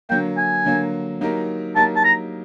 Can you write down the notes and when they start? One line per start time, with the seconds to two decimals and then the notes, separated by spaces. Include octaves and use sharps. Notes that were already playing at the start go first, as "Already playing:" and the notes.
0.09 D3 F#3 A#3 G5
0.37 G#5
0.65 D3 F#3 A#3
1.21 F#3 A#3 D#4 G4 A#4
1.75 F#3 A#3 D#4 G4 A#4 A5
1.96 A5
2.04 A#5